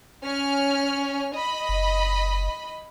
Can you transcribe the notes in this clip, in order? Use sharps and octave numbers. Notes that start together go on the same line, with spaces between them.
C#4 F6
D#5 B5
F#1